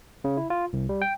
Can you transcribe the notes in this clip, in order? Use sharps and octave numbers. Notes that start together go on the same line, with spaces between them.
C#3
E4
F4
C2
G3
G5